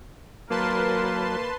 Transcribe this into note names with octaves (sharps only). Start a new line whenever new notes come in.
F#3 A#3 A#4 B4 A5 C6